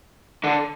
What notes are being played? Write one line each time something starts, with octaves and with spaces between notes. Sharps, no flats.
D3